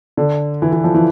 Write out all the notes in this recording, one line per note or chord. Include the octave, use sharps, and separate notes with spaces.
D3
E3
E3
F3
E3